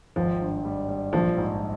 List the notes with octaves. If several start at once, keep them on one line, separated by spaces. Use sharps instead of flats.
G#1 F3
G2
G3
G3
A#1 F3
G#2